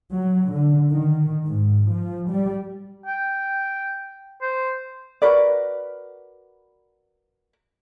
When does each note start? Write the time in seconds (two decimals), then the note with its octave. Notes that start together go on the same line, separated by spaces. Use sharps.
0.12 F#3
0.51 D3
0.90 D#3
1.47 G#2
1.90 F3
2.30 G3
3.06 G5
4.42 C5
5.22 F#4 A#4 B4 D5